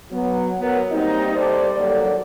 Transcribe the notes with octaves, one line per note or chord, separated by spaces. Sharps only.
F#3 B3
F#3 B3 A#4
G3 A#3 C4 D#4
G3 A4 C5 D5
D#3 F#3 G3 A#3 A4 D5